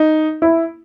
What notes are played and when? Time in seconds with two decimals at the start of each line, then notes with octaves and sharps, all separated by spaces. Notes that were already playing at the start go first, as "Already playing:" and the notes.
Already playing: D#4
0.42 E4